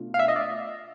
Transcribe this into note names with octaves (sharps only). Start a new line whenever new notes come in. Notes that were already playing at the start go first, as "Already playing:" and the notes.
Already playing: B2 A3 D4 F4
F5
E5
D#5
D5